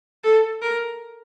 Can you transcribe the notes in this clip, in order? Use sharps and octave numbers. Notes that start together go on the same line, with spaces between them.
A4
A#4